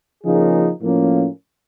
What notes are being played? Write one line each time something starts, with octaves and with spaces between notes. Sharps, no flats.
C#3 F3 A#3 D#4 G#4
A2 F3 A#3 C#4